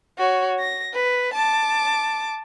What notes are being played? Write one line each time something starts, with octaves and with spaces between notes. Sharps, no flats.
F#4 C#5
A#6
B4
A5 D6